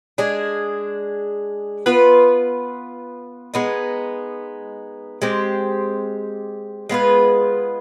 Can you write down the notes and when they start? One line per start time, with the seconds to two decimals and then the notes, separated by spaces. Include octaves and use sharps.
0.18 G#3 D4 G#4
1.86 B3 F4 B4
3.54 G#3 B3 D#4
5.22 G#3 C4 G4 C5
6.89 G#3 B3 F4 B4